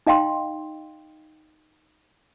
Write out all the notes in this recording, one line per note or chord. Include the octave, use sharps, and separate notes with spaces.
D#4 D#5 F5 G5 C6